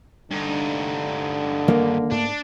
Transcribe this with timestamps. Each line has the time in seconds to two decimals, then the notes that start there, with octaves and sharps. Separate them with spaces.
0.31 G2 D3 D#4
1.68 D#3 G3 A#3
2.11 G#2 A3 B3 D4